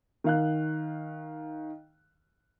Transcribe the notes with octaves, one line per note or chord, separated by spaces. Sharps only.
D#3 F5 F#6